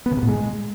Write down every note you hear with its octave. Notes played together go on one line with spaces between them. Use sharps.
B3
C#3
C3
A2
G#3